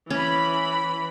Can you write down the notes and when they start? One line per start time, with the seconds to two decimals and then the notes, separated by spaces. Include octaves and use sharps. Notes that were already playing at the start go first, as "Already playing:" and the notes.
0.10 E3 C#4 B5